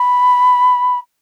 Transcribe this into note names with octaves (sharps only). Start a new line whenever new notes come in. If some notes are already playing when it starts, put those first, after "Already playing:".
Already playing: B5